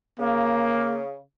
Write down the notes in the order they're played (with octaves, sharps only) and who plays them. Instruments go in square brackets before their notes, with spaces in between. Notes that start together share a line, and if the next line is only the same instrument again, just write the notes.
[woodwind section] C#3 [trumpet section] A#3